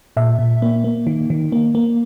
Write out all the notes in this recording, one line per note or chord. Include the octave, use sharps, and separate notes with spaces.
A#2 E5
A#2
A#3
A#3
D#3
D#3
A#3
A#3